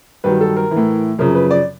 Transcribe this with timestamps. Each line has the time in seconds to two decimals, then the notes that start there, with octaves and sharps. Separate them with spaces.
0.24 G2 D#3 F#3 B4
0.41 A4
0.57 A#4
0.71 E3
0.76 A2
1.19 F#2 C#3 F3 A#4
1.35 B4
1.51 D5